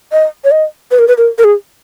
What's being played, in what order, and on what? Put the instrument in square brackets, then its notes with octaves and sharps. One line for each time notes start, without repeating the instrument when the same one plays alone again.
[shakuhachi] D#5
C#5
D#5
B4
A#4
B4
A#4
A#4
G#4